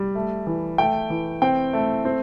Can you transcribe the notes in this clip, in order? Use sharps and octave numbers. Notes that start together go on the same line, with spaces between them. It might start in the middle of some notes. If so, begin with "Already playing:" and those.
Already playing: G3
A3
E3
A3 G5
E3
C4 G5
A3
C4